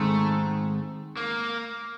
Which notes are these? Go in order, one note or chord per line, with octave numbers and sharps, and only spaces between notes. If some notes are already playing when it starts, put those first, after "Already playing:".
Already playing: G#2 D#3 G#3 A3 C4
A#3